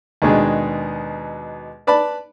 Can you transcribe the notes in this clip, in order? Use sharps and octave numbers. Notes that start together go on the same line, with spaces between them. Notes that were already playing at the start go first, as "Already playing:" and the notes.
D#2 B2 G#3 D4
B4 D5 A5 B5